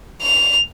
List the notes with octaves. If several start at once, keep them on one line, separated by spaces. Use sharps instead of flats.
F7